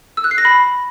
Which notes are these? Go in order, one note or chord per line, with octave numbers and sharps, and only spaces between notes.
E6
F#6
C7
A#6
B5